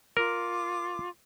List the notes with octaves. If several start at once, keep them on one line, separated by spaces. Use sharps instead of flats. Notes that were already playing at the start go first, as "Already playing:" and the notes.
F4 A#4 D6